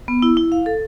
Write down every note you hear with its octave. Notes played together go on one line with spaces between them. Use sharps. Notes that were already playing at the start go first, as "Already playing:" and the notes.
B3
E4
E4
F5
A4